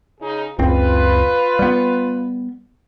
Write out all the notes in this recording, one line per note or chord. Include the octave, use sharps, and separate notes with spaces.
C#3 D#4 G#4
F#1 C#2 C4 F4 B4
G3 B3